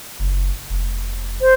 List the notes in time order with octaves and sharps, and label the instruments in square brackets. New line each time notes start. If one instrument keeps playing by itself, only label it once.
[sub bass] F#1
F1
[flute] C5